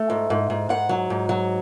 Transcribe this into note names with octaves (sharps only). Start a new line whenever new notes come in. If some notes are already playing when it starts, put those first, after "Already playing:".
Already playing: A3
G#2
G#2
G#2
G#2 F#5
F#3
G#2
F#3